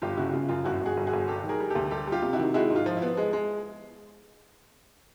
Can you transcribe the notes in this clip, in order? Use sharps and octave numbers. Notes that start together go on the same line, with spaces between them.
G1 F4 G4
C#3 E4 F#4
C#3 F4
F#2 F4
G1 E4 F#4
G1 F#4 G#4
G1
F#4 G#4
G1
G3 G4 A4
D#3
G#4 A#4
G3
G4 A4
D2
G3 G4 A4
G3 F4 G4
C3
E4 F#4
D#3
G#3 E4 F#4
G#2
F4
F3
E4
B3
G#3
G#3